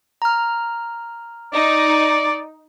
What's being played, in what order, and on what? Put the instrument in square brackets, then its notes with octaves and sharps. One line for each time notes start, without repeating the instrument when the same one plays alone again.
[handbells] A#5 F6
[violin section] D#4 [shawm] D5